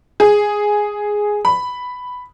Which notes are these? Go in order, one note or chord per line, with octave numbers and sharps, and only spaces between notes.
G#4
B5